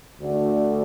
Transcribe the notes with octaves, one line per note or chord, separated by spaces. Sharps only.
D2 D3 A3 F#4